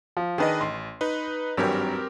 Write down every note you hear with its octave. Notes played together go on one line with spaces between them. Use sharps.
F3
D#3 D4 G#4 B4 D#5
A1 C6
D#4 B4
G#1 G2 F#3 C4 G4 A#4